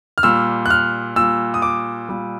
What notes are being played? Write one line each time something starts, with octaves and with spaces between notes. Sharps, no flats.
F6
A#2 G3 E6
F#6
F6
A#2 G3 E6
D#6
D6
A#2 G3